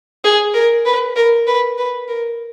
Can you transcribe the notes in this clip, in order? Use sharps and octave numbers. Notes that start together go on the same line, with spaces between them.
G#4
A#4
B4
A#4
B4
B4
A#4